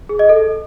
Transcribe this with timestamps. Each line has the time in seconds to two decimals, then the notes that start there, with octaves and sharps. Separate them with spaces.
0.09 G#4
0.19 D#5
0.29 A4